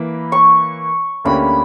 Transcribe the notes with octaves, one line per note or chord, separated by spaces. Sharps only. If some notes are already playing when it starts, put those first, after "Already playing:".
Already playing: E3 A#3 E4 B4 B5
C#6
D2 D3 A#3 C#4 G4 B5